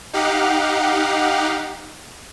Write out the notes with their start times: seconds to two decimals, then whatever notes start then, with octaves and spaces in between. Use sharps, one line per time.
0.13 D#4 G4 F5 F#5